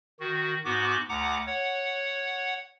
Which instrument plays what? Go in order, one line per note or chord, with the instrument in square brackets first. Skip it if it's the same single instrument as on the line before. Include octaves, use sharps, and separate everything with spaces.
[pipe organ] D#3 F#4
G#2 B3 F#4 D6
D2 F#5 A#5 D6
C#5 F#5